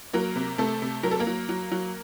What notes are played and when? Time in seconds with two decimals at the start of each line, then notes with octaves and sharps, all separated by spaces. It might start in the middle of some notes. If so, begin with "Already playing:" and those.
0.13 F#3 A#3 A#4
0.36 C3
0.58 C3 A3 A4
0.82 C3
1.03 F#3 A#4
1.11 A4
1.19 A#3 A#4
1.27 F#3
1.49 F#3
1.72 F#3